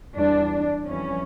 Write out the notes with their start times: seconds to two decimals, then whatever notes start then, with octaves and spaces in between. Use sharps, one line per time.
0.16 E2 E3 G3 D4
0.86 F2 E3 G3 C#4